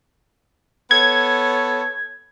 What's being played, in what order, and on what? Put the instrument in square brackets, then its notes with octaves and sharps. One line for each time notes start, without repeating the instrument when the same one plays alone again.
[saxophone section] B3 A4 C#5 [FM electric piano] G#6